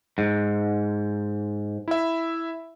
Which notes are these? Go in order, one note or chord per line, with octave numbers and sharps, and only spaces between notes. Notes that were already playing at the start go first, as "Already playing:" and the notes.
G#2
E4 E5